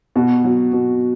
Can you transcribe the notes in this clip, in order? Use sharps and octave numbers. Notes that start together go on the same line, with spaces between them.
B2 F#4
F#3
B2